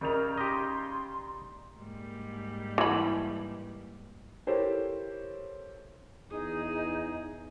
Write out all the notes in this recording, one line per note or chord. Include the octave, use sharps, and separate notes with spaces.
C#3 G3 D#4 A#4 D5 F7
G4 D#5 C6
G#2 G3 A#3
E3 B5
E4 G4 A4 A#4 C5 C#5
E2 D#4 G#4